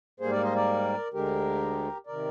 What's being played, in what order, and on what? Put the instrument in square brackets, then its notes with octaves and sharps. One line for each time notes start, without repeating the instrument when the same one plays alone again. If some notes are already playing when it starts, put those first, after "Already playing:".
[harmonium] G#2 G3 A#3 G#4 C5
A#4 D5
C5 D#5
A#4 D5
D2 D3 G#3 G4 A#4
C3 D#3 A#4 D5